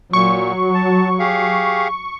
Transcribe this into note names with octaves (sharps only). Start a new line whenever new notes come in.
A#2 F#3 C#6
A5
G4 G#4 F5